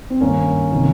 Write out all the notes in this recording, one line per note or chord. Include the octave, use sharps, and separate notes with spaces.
C4
G2 D#3 A#3 C#4
C3 D#3